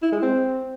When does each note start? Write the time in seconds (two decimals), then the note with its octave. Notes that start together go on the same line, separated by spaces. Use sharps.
0.03 E4
0.12 G#3
0.22 C4